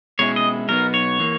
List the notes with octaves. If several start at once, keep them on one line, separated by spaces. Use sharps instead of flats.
B2 G#3 C#4 E4 C#5
D#5
B2 F#3 B3 D#4 A#4
C#5
E3 A#3